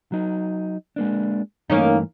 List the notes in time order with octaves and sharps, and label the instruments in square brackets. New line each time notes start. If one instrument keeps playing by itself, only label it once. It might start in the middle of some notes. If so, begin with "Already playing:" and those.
[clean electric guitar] F#3 D#4
G#3 A#3 D4
[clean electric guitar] G2 E3 A3 [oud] A#3 C#4 D#4